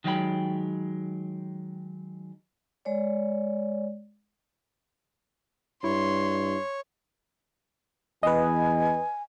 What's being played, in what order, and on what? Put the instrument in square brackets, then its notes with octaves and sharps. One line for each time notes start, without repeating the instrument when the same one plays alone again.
[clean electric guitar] D#3 F#3 G#3 G4 G5 B5
[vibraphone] G#3 C#5 D5
[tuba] G2 [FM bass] E4 [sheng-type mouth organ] C#5 [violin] C6
[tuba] E2 [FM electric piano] B4 D#5 [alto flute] G#5